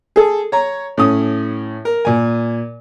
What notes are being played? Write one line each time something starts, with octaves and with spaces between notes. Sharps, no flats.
G#4 A4
C#5 A#5
A2 C#4 D#6
A#4
A#2 G#5